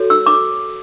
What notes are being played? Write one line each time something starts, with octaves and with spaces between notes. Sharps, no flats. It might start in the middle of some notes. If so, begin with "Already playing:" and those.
Already playing: F#4 A4 C#5
E6
D6